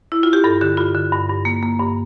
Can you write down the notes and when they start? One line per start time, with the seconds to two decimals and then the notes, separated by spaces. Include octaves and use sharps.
0.12 E4
0.23 F4
0.33 G4
0.44 G2 A4
0.61 D3 G4
0.77 G2 F4
0.95 D3
1.12 G2
1.29 G2
1.45 A#3
1.63 A#3
1.79 G2